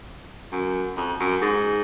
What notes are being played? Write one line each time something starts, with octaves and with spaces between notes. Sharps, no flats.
F#2
F2
F#2
G#2